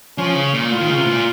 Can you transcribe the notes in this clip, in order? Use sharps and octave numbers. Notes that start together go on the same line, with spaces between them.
F3 C#4
C#3
A#2
A2 F4
D#3
C#3
C3
A2
A#2